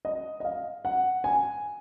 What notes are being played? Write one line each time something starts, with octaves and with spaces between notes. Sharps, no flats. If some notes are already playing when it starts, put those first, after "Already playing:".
D#5
D#5
F5
F#5
G#5